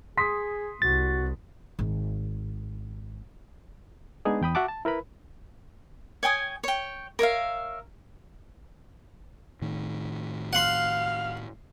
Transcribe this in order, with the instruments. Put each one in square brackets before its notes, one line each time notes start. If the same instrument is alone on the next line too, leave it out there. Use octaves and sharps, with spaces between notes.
[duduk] G#4 [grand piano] C6 D#6 B6
[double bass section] C2 [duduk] F#4 [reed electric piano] A6
[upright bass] G#1
[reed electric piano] G#3 B3 D4 D#4 G#4
E2 G5 B5 D#6
F#4 E5 F#5 A5 D6
A5
E4 A#4 B4 B5
[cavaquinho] C#5 G5 G#5 D#6
C#5 G5
A#4 C#5 E5 F5
[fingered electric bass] A2 D#3
[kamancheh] F5 F6 [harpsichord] F#5 C6